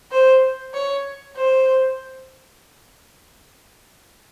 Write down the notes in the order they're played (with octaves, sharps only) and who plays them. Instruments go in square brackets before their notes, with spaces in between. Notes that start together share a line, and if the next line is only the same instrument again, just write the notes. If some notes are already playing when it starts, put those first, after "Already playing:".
[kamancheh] C5
C#5
C5